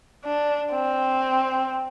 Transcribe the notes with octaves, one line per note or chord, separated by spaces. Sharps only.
D4
C4